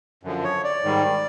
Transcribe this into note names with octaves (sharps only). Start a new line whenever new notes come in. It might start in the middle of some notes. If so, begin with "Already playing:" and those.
F#2 D3 F3
C#5
D5
G#2 D#3 G3